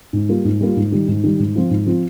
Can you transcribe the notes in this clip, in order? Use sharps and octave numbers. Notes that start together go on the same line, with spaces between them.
G#2
G3 A#3 F4
G#2
G3 A#3 F4
G#2
D#3 G3
G#2
D#3 G3
G#2
F3 C4 F4
G#2
F3 C4 F4